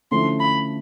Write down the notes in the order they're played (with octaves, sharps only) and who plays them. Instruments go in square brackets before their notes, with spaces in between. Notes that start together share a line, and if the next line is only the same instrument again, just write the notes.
[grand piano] D3 F3 A3 C#4 E4 [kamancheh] C6
[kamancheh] B5